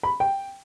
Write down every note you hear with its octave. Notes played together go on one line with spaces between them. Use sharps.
B5
G5